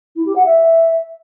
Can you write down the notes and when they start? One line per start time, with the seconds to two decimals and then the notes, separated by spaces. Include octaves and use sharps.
0.16 E4
0.26 G4
0.35 F#5
0.45 E5